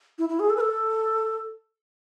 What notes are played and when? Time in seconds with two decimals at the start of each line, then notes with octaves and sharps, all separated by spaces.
0.18 E4
0.29 E4
0.39 G#4
0.50 A4
0.56 B4
0.60 A4